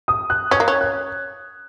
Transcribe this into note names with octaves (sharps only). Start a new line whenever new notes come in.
D#6
F#6
C#4 G#6
A#3
C#4
F#6